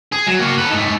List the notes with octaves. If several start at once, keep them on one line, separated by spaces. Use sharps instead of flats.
G#4
F#3
A#3 F#4
A4 B4
G#2 A3